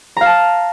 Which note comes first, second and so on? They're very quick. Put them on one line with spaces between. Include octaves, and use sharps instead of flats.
A#5 F5 A5